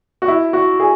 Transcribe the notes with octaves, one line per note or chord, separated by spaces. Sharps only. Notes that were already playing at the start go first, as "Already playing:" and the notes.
F#4
E4
F#4
G#4